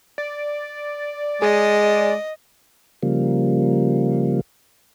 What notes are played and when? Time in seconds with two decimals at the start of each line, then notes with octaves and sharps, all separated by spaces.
0.18 D5
1.42 G#3 G#4 D#5
3.03 C#3 F3 G3 A#3